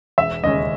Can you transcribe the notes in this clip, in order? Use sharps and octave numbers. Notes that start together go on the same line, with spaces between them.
E1 E5
D#2 C#3 G#3 C#4 D#5